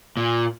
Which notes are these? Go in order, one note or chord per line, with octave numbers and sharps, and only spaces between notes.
A#2